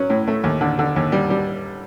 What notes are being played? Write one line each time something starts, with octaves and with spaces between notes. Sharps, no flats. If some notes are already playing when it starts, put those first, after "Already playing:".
Already playing: F#3 C#4
A2
A3
D#2
D3
D3
D#2
G3
G3